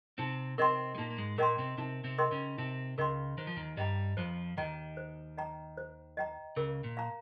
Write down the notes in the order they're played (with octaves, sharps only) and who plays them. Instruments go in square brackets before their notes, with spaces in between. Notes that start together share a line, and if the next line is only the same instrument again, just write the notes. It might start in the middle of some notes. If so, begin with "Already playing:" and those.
[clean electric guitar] C3 C4 [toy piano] D#4
[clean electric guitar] C3 C4 [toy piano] A#4 D#5 G5 C6
[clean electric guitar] G#3
[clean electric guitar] A#2 A#3 [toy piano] D#4
[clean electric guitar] A#3
G#2 G#3
[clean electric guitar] A#2 A#3 [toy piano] A#4 D#5 G5 C6
[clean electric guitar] C3 C4
[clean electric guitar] C3 C4 [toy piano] D#4
[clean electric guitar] C3 C4
[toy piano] A#4 D#5 G5 C6
[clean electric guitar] C#3 C#4
[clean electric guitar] C3 C4 [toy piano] D#4
[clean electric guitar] C#2 C#3 [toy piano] A#4 D#5 G5 C6
[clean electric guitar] D#3 [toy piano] C5
[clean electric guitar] F3
D#2 D#3
[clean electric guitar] G2 G3 [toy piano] D#5 G5 A#5
[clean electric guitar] F2 F3 [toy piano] C5
[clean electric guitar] D#2 D#3 [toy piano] D#5 G5 A#5
[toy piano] C5
D#5 G5 A#5
C5
D#5 G5 A#5
[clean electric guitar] C#2 C#3 [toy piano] A#4
[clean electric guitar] A#2
[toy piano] F5 A#5